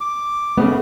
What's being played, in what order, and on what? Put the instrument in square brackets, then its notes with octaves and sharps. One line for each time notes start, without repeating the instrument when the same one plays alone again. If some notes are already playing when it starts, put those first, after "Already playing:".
[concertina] D6
[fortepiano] C#3 B3 [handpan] A3